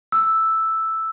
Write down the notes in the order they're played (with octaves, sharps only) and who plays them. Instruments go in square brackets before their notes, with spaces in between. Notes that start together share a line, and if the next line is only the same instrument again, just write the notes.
[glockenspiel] E6